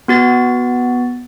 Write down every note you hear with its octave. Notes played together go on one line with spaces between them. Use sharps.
B3 F#4 A6